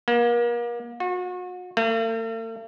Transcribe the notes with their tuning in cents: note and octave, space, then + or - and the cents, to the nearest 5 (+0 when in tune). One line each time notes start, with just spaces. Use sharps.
A#3 +35
F#4 -40
A3 +45